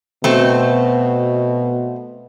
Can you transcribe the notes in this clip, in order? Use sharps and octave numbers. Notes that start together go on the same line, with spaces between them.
B2 A3 C4